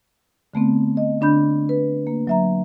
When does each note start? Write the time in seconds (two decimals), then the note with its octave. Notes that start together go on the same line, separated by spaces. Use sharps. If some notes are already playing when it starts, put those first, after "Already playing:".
0.54 D3 A3 B3 C4
0.97 D#5
1.21 D3 D4 B5 G6
1.69 B4
2.07 A#3
2.27 F#3 E5 A#5